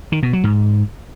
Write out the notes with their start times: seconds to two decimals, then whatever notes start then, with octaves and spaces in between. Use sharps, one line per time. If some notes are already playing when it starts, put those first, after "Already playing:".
0.12 D#3
0.23 B2
0.33 F#3
0.44 G#2